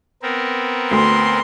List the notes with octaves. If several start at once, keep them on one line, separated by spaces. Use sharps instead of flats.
B3 C4 A#4
D2 C6